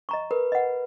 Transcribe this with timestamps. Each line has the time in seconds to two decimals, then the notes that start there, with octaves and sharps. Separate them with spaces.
0.09 D#5 A#5 C#6
0.31 A#4 B4
0.52 D#5 F#5